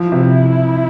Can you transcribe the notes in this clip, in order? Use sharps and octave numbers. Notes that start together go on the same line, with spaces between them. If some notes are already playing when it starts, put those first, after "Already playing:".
Already playing: F3 E4
C3